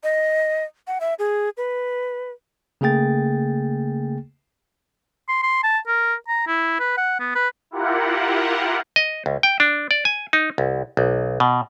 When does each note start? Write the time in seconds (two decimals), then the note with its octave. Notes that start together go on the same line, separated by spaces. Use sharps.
0.03 D#5
0.87 F#5
1.01 E5
1.19 G#4
1.57 B4
2.81 C#3 A3 A#3 G#4 G5 A6
5.29 C6
5.43 C6
5.64 A5
5.87 A#4
6.28 A#5
6.47 E4
6.80 B4
6.97 F#5
7.20 B3
7.35 B4
7.71 E4 F4 G4 A#4 F#5
8.96 D#5
9.26 C#2
9.43 G5
9.60 D4
9.91 D5
10.05 G#5
10.33 D#4
10.58 C2
10.97 B1
11.40 B2